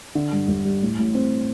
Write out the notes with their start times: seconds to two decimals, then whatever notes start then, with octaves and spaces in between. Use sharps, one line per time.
0.15 D3
0.32 G2
0.48 G1
0.65 G3
0.82 A2
0.99 A1
1.15 C4